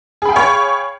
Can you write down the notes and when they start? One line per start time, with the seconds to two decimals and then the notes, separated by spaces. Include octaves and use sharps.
0.22 G#4
0.25 B5
0.29 G5
0.32 F5
0.36 C#5